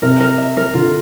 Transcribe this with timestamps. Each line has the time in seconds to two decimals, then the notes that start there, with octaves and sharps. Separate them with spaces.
0.02 C3 A#4
0.20 A#4
0.38 E5
0.57 A#4
0.74 D3 F4